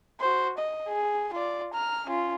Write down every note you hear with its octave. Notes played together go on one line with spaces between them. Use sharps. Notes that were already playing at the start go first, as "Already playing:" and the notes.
F#4 C5
D#5
G#4
F4 D5
A#5 F6
C#4 F4